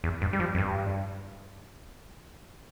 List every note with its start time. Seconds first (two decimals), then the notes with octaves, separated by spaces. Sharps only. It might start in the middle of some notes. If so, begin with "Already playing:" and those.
0.04 E2
0.21 G2
0.33 G3
0.40 F3
0.55 F2
0.58 G2